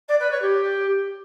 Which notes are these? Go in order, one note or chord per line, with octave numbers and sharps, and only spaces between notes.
D5
B4
C#5
G4